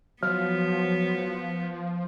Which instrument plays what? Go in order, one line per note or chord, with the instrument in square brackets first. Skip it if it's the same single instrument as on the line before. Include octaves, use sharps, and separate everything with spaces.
[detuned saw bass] F3 [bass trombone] F#3 [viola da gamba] B3 [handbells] F6